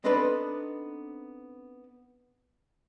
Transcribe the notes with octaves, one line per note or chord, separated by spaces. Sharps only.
B3 C4 D4 D#4 A4 B4